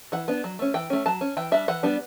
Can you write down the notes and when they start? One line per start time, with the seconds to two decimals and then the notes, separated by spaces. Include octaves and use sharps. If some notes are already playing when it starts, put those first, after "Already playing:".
0.12 E3 F#5
0.28 B3 D4
0.44 F#3
0.59 A3 C#4
0.74 E3 G5
0.90 A3 C#4
1.06 F#3 A5
1.21 C#4
1.37 E3 G5
1.52 G3 D4 E5
1.68 E3 F#5
1.83 G3 B3 D4